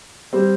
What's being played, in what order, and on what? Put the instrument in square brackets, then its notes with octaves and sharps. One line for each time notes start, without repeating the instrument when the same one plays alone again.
[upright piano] G3 C4